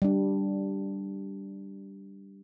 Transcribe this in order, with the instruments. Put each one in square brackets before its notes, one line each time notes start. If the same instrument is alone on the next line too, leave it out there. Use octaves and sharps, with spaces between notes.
[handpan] G3 D4